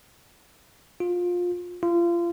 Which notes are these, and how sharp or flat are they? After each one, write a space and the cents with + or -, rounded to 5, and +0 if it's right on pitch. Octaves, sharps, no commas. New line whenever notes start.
F4 +20
F4 -30